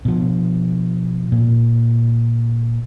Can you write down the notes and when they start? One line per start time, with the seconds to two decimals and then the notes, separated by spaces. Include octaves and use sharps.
0.05 B2 F3
1.32 A#2